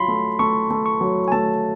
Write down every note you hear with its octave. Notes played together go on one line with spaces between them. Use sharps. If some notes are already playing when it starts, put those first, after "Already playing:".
Already playing: F#3 F4 B5 C6
A3
A3 C#6
A3
C#6
F#3
G#5
A3 A5